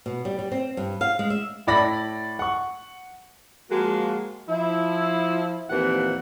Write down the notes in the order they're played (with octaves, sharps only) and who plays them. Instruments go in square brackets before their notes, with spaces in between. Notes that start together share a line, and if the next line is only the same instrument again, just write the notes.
[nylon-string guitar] B2
G3
G3
C4
G2
F5
G#3
E5
[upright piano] A2 E4 D5 B5 A#6
F#5 C#6
[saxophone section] F3 G#3 A#3 F#4
F3 E4
D#2 A#2 E3 F3 C4 F#5